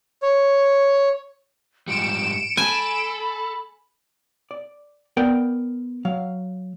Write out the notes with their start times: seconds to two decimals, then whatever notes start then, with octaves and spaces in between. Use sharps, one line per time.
0.23 C#5
1.88 G#2 F3 G3 C#7 D7 E7
2.57 A4 G#5 B5
4.51 D5
5.17 B3 A#4 D5 F#5 G5
6.05 F#3 F5